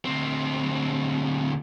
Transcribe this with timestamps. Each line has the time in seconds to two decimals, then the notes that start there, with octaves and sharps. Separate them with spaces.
0.05 D2 C4